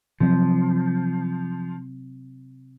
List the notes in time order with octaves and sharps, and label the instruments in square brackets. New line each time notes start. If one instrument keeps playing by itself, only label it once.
[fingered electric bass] C3 F#3 C4 [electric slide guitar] F3